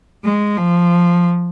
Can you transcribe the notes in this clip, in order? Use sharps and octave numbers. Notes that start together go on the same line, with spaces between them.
G#3
F3